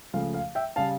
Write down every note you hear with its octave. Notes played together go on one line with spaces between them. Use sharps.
C#2 C#3 F3 A3 F5
F5
E5 G5
C#3 G3 F5 A5